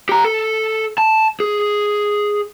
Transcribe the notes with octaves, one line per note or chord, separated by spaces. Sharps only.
G4 A#5
A4
A5
G#4